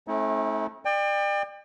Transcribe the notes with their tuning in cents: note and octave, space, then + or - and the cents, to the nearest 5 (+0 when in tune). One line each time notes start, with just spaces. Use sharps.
A3 -20 C4 +45 D#4 +45
D5 +35 G5 +30